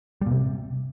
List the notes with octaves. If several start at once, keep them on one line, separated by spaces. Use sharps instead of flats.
G3
A#2
C3